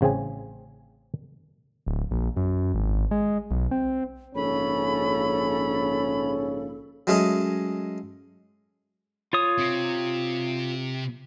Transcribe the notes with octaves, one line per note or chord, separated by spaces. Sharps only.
A1 C#3 C4 G#4 G#5
D1
A#1
F#2
G#1
G#3
B1
C4
A#1 G#2 C#3 C#4 A4 B5
F#3 G#3 A3 C#4 D#5
F4 C#5 D#6
C3 C4